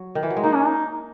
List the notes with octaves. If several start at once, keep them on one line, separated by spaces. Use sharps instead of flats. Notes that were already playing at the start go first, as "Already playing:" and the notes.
Already playing: F#3
D#3
E3
F#3
G#3
A#3 D#4
C#4
D#4